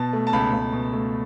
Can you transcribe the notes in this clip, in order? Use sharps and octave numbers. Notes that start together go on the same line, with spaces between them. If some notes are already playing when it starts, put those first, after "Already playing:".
Already playing: B2 A5
A3
A5
C#2 B5
C#2
B2
A3